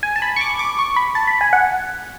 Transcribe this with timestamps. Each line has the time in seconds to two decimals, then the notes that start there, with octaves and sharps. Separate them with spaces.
0.03 G#5
0.16 A5
0.22 B5
0.36 C#6
0.41 D6
0.59 D6
0.79 C#6
0.96 B5
1.15 A5
1.27 B5
1.41 G#5
1.53 F#5